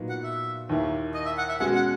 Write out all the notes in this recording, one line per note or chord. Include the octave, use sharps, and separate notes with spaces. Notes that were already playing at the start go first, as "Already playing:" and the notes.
Already playing: A#2 F#3 B3 D#4
F#5
E5
D#2 D#3 A#3 E4
D#5
E5
F#5
E5
B2 G#3 C#4 F#4 F#5
F#5